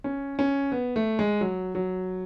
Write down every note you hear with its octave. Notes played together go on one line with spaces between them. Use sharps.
C#4
C#4
B3
A3
G#3
F#3
F#3